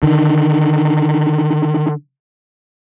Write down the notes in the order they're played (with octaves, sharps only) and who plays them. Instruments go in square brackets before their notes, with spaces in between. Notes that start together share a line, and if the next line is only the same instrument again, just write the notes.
[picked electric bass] D3 D#3